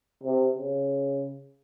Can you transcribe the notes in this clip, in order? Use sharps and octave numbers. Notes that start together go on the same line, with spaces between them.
C3
C#3